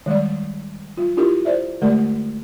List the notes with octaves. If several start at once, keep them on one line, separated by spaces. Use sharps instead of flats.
D#3 G3 G#3 D5
F#3 F4
D4 E4 F4 G4 A#4
C5 D5 E5
D3 G#3 A3 G4 A#4 D5